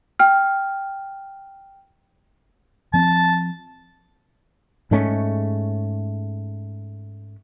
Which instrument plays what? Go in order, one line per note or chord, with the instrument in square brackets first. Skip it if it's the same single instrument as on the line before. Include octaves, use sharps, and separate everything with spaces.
[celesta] G5 F6
[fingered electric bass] F3 C4 [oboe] A5
[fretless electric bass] G#2 G#3 A3 C#4